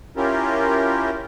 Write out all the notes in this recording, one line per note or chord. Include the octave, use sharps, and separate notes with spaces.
C#4 E4 F4 G4 A#4